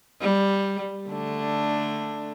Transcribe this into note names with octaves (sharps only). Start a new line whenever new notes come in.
G3
D3 A3 D4